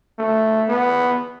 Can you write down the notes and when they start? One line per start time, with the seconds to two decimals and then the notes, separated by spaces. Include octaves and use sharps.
0.19 A3
0.69 B3